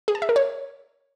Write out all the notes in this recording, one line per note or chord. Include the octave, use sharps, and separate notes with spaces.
G#4
A5
E5
A#4
C#5